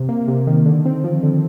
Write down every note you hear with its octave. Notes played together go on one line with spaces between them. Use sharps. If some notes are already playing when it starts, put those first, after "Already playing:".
Already playing: C3
A#3
C3
D#3
D3
C4
F3
D3